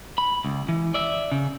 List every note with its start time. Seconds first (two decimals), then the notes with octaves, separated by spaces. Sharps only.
0.18 B5
0.45 C#2
0.69 E3
0.94 D5 E5
1.32 C#3